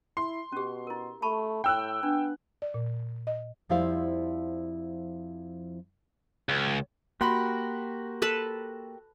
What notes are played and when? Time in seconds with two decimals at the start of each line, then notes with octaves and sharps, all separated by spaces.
0.17 E4 C6
0.52 B2 C#4 G4
0.87 E4 A#4
1.22 A3 A5 B5 C#6
1.64 A2 G5 E6 F#6
2.03 B3 D4
2.62 D5
2.74 A#2
3.27 D#5
3.69 F2 F3 G3 E4 C5 F5
6.49 C#2
7.21 A#3 F#4 G4 A#4 F#5 B5 C6
8.22 A4 B4 A5